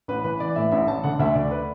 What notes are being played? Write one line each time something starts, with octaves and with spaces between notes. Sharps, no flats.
A1 B4
E3 B4
E3 D5
A2 E5
A1 E5
A1 A5
D3 F#5
D2 E5
D2 D5
B4